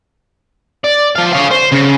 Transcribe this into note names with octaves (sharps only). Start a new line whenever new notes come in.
D5
F3 F5
C#5 F5
C5
C#3